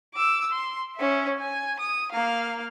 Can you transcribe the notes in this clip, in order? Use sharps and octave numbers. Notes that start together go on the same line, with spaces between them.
D6 E6
C6
C#4 E5
G#5
D#6
A#3 F5